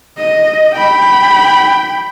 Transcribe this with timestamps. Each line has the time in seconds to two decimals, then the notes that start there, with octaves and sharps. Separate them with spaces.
0.18 D#5
0.75 G5 B5